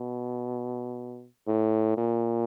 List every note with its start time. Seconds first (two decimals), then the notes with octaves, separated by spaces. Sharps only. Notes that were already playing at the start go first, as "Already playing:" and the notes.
Already playing: B2
1.47 A2
1.97 A#2